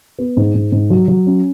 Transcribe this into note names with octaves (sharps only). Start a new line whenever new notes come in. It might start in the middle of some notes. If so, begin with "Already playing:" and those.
B3
G#2
G#2
G#2
F#3
F#3
C#4